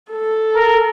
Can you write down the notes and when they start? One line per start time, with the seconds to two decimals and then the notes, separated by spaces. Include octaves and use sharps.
0.12 A4
0.56 A#4